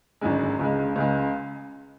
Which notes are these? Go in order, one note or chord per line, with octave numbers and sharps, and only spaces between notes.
G#1 F#2 D3 G#3
C#2 C#3 G#3
C#2 C#3 G#3